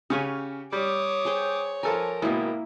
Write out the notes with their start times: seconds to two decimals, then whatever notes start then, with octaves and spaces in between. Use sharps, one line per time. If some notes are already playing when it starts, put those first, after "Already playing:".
0.10 C#3 C#4 G4 F#5 G#5
0.72 G3 C#5 D6 D#6
1.25 G#4 C5 G5
1.83 F3 A4 A#4 G#5 A#5
2.22 G#1 B2 A#3 E4